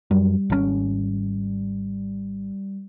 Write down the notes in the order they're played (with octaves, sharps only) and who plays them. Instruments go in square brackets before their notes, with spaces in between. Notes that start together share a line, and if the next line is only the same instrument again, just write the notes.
[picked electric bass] F#2 [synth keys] G3
[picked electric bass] G#1 D3 C#4